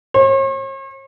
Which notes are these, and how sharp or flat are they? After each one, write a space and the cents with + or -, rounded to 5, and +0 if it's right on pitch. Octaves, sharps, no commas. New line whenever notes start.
C#5 -45